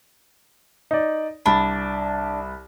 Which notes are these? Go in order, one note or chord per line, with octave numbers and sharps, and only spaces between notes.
D#4 D5
C2 D4 B5